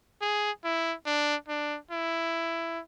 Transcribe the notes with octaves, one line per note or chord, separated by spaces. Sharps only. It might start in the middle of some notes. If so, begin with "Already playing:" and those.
G#4
E4
D4
D4
E4